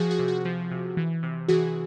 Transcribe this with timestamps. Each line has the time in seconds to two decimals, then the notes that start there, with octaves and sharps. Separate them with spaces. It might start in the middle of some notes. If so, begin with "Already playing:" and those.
Already playing: F3 F#4 G#4
0.11 F#4 G#4
0.19 C3
0.28 F#4
0.45 F3
0.71 C3
0.97 E3
1.23 C3
1.48 E3 F#4 G#4